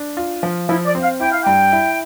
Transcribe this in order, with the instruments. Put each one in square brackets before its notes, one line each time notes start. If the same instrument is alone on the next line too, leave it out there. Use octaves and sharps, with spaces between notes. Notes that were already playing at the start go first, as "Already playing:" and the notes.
Already playing: [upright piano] D4
F4
F3
[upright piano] F3 [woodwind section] E4
[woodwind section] D5
[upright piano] C4
[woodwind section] F5
[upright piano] E4 [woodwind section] G5
[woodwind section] F5
[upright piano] G2 [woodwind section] G5
[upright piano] E4